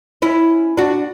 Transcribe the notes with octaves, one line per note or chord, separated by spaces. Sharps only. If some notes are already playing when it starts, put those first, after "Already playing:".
C#4 E4
D4 F#4